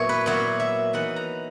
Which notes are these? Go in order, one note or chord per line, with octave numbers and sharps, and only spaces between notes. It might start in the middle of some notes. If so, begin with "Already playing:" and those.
Already playing: A#2 F#3 B3 E4 C#5
B4
A#2 F#3 B3 E4 C#5
E5
E3 B3 D#4 F#5
A#5